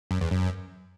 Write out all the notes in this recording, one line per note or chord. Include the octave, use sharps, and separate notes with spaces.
F#2
E2
F#2